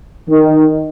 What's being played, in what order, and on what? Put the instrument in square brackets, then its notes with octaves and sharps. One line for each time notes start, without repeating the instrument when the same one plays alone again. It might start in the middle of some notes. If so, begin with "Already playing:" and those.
[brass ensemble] D#3